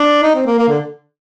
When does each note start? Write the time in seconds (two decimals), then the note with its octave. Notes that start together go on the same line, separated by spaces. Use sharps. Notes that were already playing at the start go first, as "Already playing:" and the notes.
Already playing: D4
0.23 D#4
0.35 C4
0.46 A#3
0.59 A#3
0.68 D3